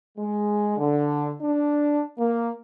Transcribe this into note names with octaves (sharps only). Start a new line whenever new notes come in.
G#3
D3
D4
A#3